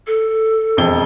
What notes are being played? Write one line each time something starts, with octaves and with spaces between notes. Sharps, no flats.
A4
E1 F2 G7